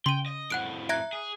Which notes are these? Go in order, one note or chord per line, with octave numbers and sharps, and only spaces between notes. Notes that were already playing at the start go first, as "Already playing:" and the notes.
C#3 G5 C6 D#7
D#5
F2 A2 F#5 F#6 D7
E5 A#5 F#6 G#6 A#6 D7
G#4